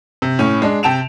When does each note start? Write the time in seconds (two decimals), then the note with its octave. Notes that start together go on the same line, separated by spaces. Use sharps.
0.22 C3
0.39 A2 C#4
0.62 G#3 D4
0.83 C3 G5 A5 D7 E7 F7